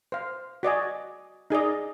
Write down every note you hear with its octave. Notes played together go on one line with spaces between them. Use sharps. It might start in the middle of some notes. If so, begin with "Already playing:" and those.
C5 F5
F#4 D5 D#5 G#5
D#4 G#4 D5 D#5